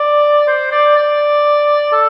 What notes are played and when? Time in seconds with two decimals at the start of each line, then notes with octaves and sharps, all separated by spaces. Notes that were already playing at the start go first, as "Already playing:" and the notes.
Already playing: D5
0.48 C5
0.72 D5
0.96 D5
1.92 A4